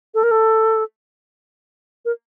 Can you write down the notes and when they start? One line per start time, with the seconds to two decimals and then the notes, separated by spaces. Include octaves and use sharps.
0.14 A4
0.23 A#4
0.31 A4
2.05 A#4